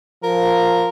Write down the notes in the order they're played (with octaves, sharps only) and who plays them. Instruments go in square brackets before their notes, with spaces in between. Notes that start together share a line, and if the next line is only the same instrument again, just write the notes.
[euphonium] F3 [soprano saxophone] A#4